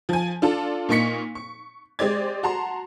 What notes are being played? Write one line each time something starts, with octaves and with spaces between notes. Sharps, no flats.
F3 G#5
D4 F4 A4 A5
A#2 A#3 D#4 C#6 B6 C#7
C#6
G#3 G4 C5 D5 G#6
F#4 A5 A#5 C6